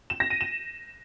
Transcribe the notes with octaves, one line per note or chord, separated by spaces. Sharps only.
E7
A#6
D#7
E7